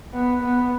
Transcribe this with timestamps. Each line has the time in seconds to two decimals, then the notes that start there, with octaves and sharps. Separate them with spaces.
0.13 B3
0.42 B3